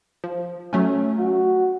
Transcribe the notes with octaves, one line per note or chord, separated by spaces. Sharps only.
F3
F#3 A3 C#4
F#4